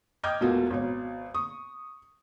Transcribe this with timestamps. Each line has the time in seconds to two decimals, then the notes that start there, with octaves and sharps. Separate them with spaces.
0.23 D#5 G5 D6 F6 G6 G#6
0.41 E1 B2 A3 A#3 F4 F#4
0.70 G#1 B2 C#5
1.34 C#6 D#6